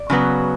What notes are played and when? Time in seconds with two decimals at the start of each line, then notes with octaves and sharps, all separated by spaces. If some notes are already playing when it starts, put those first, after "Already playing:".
Already playing: D5
0.10 C#3 F#3 B3